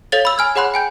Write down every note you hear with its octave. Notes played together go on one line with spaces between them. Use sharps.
A4 C#5 F5 A6 G7
B5 E6
G#5 F6 G#6
G#4 C#5 F#5 B5 C6 F#6
G5 G#5 G6